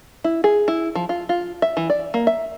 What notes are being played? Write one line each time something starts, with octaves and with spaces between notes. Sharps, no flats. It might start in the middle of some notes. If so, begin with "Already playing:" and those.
E4
G#4
E4
F3
F4
F4
E5
E3
D5
A#3
E5